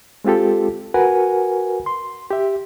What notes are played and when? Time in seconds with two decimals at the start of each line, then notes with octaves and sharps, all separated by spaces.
0.24 G#3 C4 F4 G4 A4
0.94 F#4 A#4 B4 F#5 G#5
1.86 C6
2.31 G4 E5